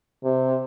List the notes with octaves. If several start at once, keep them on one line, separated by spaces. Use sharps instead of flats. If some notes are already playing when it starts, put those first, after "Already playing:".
C3